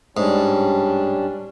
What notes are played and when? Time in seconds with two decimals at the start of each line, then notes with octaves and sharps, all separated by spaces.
0.17 D1 G#2 G3 C#4 D4